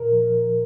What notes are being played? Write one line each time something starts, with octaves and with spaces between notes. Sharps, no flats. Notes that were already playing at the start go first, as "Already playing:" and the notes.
Already playing: A#2 A#4
F3